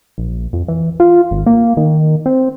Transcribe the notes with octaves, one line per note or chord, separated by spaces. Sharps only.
A#1
F2
E3
F4
G#1
A#3
D#3
C4